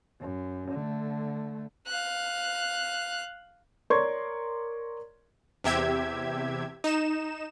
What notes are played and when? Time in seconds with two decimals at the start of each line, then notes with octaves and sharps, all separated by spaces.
0.21 F#2
0.71 D3 A3
1.87 F5 F#6
3.90 A#4 C#5 D5 C6 C#6 G#6
5.64 E2 C3 G4 E5 G#6
6.84 D#4 E7